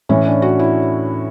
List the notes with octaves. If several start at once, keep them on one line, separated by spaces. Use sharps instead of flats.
A2 E3 C#4
D4
F#4
E4